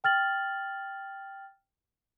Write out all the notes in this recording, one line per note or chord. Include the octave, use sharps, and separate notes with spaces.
G5 F6 A6 F#7